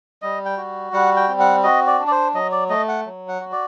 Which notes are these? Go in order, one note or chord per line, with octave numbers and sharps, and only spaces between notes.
G3 D#5
G5
F#4
G3 F#5
G5
C4
F#5
F#4 D#5
D5
D4
D5
C5
F#3 D#5
D5
A3 D#5
F#5
F#3
F#5
F#4
D5